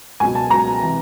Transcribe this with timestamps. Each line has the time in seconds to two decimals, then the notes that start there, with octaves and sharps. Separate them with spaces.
0.20 C#2 B2 F#3 G#5
0.35 A5
0.50 C#2 B2 F#3 A#5
0.81 C3 E3